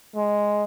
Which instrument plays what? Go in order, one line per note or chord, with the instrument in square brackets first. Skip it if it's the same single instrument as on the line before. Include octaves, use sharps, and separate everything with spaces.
[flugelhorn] G#3